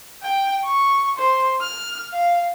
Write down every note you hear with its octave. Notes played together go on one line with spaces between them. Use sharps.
G5
C#6
C5
F6
F5